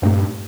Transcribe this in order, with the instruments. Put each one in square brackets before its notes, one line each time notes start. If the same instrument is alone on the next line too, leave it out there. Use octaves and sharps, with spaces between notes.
[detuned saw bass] G2 [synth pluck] A#2 A3 C4 D#4 G4